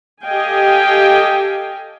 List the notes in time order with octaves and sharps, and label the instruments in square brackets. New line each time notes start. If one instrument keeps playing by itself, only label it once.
[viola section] G4 A4 D#5 F5 G5 G#5